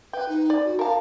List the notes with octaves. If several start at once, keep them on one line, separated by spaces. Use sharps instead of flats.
B4 G5
D#4
D5
F#4
A#4 F5 A5